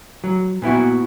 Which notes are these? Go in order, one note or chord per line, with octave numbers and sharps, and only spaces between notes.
F#3
A#2 B3 E4 F#4